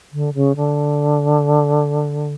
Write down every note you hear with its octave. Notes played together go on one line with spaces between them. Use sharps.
D3
C#3
D3